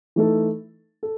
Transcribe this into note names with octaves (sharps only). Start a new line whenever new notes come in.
E3 A3 D#4 A4
A4